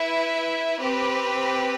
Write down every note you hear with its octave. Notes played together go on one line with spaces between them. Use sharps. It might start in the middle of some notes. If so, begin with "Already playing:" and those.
Already playing: E4 B4 E5
C4 G4 B4